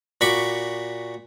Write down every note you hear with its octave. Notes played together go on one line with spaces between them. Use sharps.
A#2 F#4 B5 C#6 D6